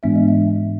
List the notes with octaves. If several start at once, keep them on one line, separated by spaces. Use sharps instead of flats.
G#2 E3 G#3 B3 D4 E5
D#5
E5